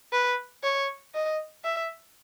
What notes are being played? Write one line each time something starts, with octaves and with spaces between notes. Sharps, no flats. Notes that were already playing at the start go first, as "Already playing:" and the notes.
B4
C#5
D#5
E5